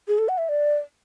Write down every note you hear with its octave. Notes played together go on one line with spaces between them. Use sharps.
G#4
A4
F#5
E5
D5